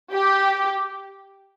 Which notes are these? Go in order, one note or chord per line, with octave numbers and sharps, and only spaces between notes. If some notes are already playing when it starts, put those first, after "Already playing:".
G4